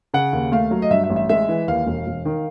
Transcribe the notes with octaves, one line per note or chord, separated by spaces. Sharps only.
C#3 F#5
D#2
A3 F5
F#3
D#5
G2 E5
E5
A1
E5
G#3 E5
E3
D#2 F5
E1
E1
D#3